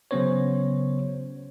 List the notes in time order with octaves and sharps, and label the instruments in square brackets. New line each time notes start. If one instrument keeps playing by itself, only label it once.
[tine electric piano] C#3 F#3 B3 C#4 C5 C#5